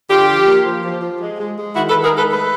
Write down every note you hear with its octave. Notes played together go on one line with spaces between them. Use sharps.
D3 F4 G4
F3
A#3
F3
F3
F3
G#3
G#3
G#3
D#3 E4 F#4
A4 B4
D#3
G#4 A#4
G#3 A4 B4
A3 A4 B4